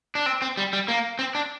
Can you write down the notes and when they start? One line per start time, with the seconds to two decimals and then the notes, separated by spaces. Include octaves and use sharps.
0.15 D4
0.26 C4
0.42 C4
0.57 G3
0.73 G3
0.88 A#3
1.19 C4
1.35 D4